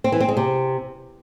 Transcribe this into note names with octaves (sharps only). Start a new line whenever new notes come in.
C4
E3
C4
G#3
C3